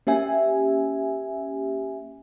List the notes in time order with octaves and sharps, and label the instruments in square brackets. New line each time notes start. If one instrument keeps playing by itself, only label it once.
[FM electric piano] A#3 C#4 G4 E5 G#5